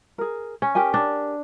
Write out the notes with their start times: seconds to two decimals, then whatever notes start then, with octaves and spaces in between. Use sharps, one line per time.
0.18 G#4 A#4
0.62 C#4
0.75 G4 A#4 G#5
0.94 D4